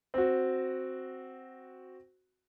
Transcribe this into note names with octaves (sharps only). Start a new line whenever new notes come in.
C4 F#4